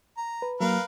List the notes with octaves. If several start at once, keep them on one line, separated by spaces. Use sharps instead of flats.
A#5
B4
F#3 A#3 A#4 B4 F5